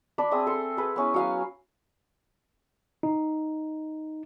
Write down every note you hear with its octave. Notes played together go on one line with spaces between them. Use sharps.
D4 A5 B5 D6
C4 G#4 E5 D#6
A4 C6
G#4 B4
B3 C#4 E4
F#3 F5 G#5
D#4